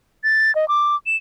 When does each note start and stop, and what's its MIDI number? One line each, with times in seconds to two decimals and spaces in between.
0.24 0.54 93
0.55 0.68 75
0.68 0.96 86
1.06 1.16 100